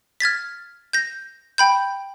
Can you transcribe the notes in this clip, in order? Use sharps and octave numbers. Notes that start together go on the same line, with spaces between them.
F6 G#6 A6 B6
G6 A#6
G5 B5 G6